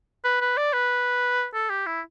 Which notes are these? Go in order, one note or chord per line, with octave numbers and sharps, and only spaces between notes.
B4
B4
D5
B4
A4
G4
E4